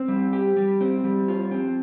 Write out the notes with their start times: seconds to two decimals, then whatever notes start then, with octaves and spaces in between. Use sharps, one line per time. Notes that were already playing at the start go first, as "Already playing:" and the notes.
Already playing: C4
0.08 G3
0.33 G4
0.57 G3
0.81 C4
1.04 G3
1.28 F4
1.51 C4